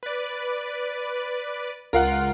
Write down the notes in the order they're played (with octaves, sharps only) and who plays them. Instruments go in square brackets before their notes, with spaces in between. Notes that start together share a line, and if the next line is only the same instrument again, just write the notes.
[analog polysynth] B4 D5
[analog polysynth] C#2 F4 [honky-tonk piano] A#4 F5 F#5